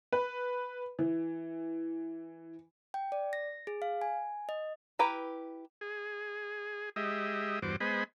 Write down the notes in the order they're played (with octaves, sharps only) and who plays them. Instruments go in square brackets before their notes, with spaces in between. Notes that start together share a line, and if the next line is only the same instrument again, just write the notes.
[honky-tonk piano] B4
E3
[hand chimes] G5
D5
A#6
G#4
F5
G#5
D#5
[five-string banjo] E4 G4 B4 A#5
[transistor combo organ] G#4
G#3 G4 D#5 E5
E2 G2 F#4 C5 D6
G#3 B3 C5 D#5 G#5 B5